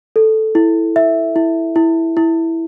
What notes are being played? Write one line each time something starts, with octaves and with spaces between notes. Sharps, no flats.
A4
E4
E5
E4
E4
E4